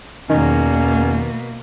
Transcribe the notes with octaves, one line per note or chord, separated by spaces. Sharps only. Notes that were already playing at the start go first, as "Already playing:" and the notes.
E2 B2 D#3 A#3 C#4